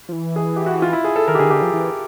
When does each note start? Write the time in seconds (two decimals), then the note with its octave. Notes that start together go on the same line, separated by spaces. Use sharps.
0.09 F3
0.12 E3
0.36 G#4
0.56 G4
0.66 F#4
0.82 F4
0.93 E4
1.04 G#4
1.16 A4
1.27 D#3 A#4
1.35 G4
1.39 D3 G#4
1.46 D#3
1.50 D3 G4
1.62 F3
1.74 E3